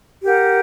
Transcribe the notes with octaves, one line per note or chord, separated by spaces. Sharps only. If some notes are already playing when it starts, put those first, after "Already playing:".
G4 A#4 F#5